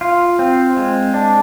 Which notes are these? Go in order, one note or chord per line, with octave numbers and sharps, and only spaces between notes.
F4
C4
G#3
D4